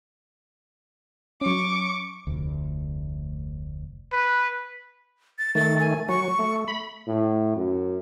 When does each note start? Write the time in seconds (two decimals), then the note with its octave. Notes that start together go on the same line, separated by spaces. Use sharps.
1.41 F#3 C#4 C#6 D6
2.27 F1 D2
4.12 B4
5.38 A6
5.55 D#3 A3 A6
5.80 G#5
6.09 F#3 C#6
6.39 A3
6.68 B5
7.07 A2
7.56 F#2